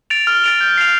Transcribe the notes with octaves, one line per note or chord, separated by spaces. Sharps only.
A6 D7 F7
F6
A6 D7 F7
G6
C7 F7